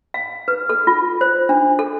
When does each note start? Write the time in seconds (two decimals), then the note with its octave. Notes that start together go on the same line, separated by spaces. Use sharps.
0.14 F5
0.48 B4
0.69 A4
0.87 F4
1.21 C5
1.49 D4
1.79 A4